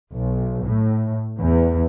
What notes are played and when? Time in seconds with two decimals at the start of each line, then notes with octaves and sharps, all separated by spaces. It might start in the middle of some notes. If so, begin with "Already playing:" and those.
0.12 B1
0.64 A2
1.39 E2